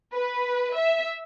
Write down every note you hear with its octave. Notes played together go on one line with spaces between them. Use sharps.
B4
E5